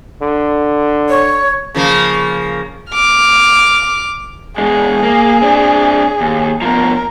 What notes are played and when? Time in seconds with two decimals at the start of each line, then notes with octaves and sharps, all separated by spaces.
0.22 D3
1.09 C#5
1.75 C#3 F3 A#3
2.92 D6 F6
4.58 E2 G#3 G#4
5.03 A#3
5.42 C4 D4
6.21 D#2
6.62 B2 F3 A#4